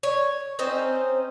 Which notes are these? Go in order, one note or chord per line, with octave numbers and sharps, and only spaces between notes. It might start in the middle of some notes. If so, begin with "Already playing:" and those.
C#5
C4 C#4 D#4 C5